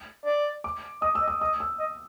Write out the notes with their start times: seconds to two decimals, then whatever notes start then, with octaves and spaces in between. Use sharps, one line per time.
0.25 D5
0.64 D6
1.02 D#5 D#6
1.15 E6
1.22 D#5
1.28 D#6
1.41 D#5 D#6
1.60 E6
1.80 D#5